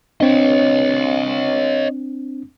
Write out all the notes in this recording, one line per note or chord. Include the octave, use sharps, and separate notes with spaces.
C4 D4 C#5 D#5